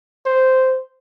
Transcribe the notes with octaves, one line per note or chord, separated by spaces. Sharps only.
C5